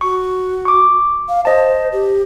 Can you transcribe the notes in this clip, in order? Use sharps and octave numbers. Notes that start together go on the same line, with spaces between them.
F#4 C#6
C#6 D6
F5
C5 D#5 A5
G4